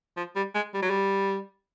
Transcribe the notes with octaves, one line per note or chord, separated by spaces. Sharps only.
F3
G3
G#3
G3
F#3
G3